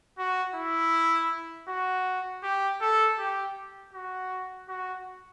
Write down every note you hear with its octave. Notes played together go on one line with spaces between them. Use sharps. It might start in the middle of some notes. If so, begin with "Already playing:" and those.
F#4
E4
F#4
G4
A4
G4
F#4
F#4